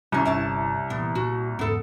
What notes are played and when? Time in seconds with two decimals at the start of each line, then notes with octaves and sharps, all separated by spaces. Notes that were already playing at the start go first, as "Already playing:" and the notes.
0.12 C2 C3 C#4 D4
0.25 G1 D3 C#4 E4 A5
0.90 A#2 E3 B3
1.15 A#2 F#4
1.59 E2 G#2 C#3 B3 A4